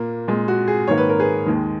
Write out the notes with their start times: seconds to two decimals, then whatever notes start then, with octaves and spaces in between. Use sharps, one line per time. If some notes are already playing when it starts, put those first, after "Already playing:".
Already playing: A#2 A#3
0.28 A#2 G#3
0.48 F#4
0.68 G#4
0.88 G#2 D#3 A#3 C#5
0.97 B4
1.09 A#4
1.19 G#4 B4
1.46 D#2 D#3 G#3